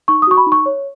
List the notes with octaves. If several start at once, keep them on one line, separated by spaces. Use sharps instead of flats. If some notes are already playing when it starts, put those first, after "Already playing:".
D#4 C#6
D#6
F#4 C#6
B5
D#4
C#6
C#5